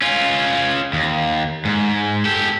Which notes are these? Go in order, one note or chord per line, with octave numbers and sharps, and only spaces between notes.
C#4 F4
D#2
G#2
G4 A4